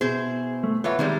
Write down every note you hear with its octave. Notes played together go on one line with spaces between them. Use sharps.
B2 E4 G#4 C5
A3
E3 B3 F4 C#5 E5 B5
D#3 G3 G#3 C4